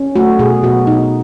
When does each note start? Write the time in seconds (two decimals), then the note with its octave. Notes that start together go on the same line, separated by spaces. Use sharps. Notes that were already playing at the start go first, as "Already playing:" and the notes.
Already playing: C#4
0.16 A3 F#4
0.39 B2 G#4
0.63 B2 F#4
0.87 B2 D#4